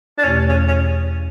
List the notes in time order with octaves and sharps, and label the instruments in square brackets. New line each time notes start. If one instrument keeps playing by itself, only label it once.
[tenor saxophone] D4
[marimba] E2 B2 A3 E4 G4 [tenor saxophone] C#4
[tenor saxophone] C#4
C#4